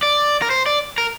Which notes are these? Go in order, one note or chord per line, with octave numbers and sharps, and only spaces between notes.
D5
A#4
C5
D5
A#4